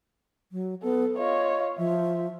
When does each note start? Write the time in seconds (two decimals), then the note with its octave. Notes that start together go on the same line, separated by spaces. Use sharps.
0.52 F#3
0.83 B3 A4
1.18 F4 C#5 D#5
1.78 F3 E5